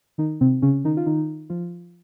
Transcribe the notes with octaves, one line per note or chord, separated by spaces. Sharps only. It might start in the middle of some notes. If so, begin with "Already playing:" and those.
D#3 D#4
C3 C4
C#3 C#4
D#3 D#4
F4
D#3 D#4
F3 F4